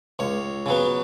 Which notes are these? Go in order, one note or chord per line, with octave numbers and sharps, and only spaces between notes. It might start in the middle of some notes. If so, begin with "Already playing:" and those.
C#2 C#5
C#3 F#3 B3